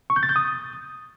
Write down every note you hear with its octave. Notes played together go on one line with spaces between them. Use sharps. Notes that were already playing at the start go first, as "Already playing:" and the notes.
C#6
G6
A6
G6
D#6